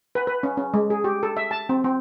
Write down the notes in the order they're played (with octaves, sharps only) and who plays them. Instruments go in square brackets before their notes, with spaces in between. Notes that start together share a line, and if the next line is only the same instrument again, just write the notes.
[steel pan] B4
B4
C#4
C#4
G#3
G#4
G4
A4
E5
A5
C4
C4